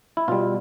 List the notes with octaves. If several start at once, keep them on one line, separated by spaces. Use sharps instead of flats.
E4
B2 G3 F4